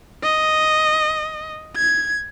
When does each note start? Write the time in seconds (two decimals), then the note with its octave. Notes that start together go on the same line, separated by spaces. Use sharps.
0.23 D#5
1.76 G#6